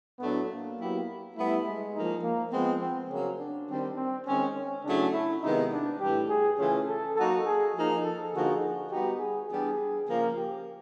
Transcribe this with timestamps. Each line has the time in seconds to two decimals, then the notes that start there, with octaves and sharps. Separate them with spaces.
0.19 A2 F#3 A3 B3 D4
0.48 A#3
0.77 F#3 B3 E4 G4
1.36 G3 A3 B3 E4
1.65 G#3
1.94 F3 A#3 D#4
2.23 A#3
2.52 F3 G#3 B3 C4
2.80 C4
3.10 C#3 F#3 A#3 C#4
3.39 D4
3.68 D#3 G3 C4
3.97 C4
4.26 D#3 G#3 C4 C#4
4.55 C#4
4.84 C#3 F#3 A3 C#4 D4 E4
5.13 E4
5.42 C3 D#3 G#3 B3 D#4 E4
5.72 D4
6.00 A2 E3 G3 G4
6.29 G#4
6.58 C#3 E3 A3 C#4 F4 G#4
6.87 A4
7.16 F#3 A#3 D#4 F#4 A4
7.45 G#4
7.75 F3 A#3 D#4 G#4
8.04 A4
8.33 D3 F3 A#3 D#4 F#4 G#4
8.91 G3 B3 D#4 F#4 G4
9.19 G#4
9.49 E3 G3 B3 D4 G4 G#4
10.06 C#3 F3 A#3
10.36 G4